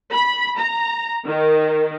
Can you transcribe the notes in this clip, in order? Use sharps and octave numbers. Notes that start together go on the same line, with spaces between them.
B5
A#5
D#3